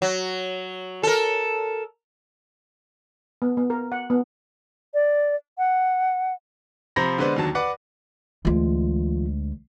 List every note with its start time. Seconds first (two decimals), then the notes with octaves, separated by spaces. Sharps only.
0.02 F#3
1.03 A4 A#4
3.42 B3
3.57 B3
3.70 A#4
3.92 F#5
4.10 B3
4.94 D5
5.58 F#5
6.96 C3 F3 C5 A#5 B5 A#6
7.18 D3 G#3 B3 B4 C5 D5
7.36 D#2 D3 F#3 A5
7.55 B4 D5 F#5 D6
8.45 D2 E3 G#3 F4